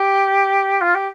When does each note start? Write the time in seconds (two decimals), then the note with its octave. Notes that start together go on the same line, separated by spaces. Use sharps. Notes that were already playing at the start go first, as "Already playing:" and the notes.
Already playing: G4
0.81 F4
0.94 G4